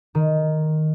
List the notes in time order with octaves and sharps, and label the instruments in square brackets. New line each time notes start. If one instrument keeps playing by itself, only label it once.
[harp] D#3